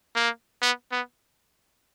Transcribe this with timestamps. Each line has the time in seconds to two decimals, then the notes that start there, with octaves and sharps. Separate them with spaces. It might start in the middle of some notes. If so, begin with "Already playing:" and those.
0.16 A#3
0.62 B3
0.92 B3